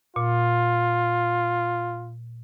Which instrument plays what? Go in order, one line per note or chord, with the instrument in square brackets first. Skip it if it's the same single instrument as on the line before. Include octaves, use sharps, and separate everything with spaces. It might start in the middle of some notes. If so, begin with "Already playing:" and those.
[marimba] A#2 [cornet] F4